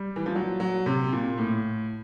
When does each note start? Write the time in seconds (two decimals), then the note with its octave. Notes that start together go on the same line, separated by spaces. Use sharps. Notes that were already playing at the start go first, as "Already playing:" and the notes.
Already playing: G3
0.16 E3
0.26 F3
0.35 F#3
0.60 F#3
0.86 C3
1.12 A#2
1.38 A2